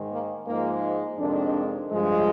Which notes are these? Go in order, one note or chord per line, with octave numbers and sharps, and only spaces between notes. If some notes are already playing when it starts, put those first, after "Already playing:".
Already playing: G#2 D#3 G#3
A#3
G#2 F3 G#3 A#3
F2 C3 D#3 G#3 D4
G2 F3 G#3